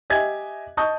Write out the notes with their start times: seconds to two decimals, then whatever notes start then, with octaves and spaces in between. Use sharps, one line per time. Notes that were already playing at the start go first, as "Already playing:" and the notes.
0.10 G4 D#5 E5 G#5 G#6
0.77 D#5 A5 C#6 D#6 G6